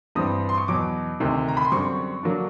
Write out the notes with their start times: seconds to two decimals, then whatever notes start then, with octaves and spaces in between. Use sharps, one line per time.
0.15 G2 E3 G3 C4 D#6
0.49 C6
0.58 C#6
0.68 E2 B2 F#3 D6
1.20 D2 C3 D#3
1.48 A#5
1.57 B5
1.65 C6
1.72 F#2 D3 G3 C4 C#6
2.23 D3 F#3 A#3 D4